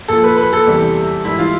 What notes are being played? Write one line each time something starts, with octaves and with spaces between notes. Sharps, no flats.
A#2 F3 A4
B4
B4
A4
E2 C3 E3 G3
G#2 E3 G3 E4
F4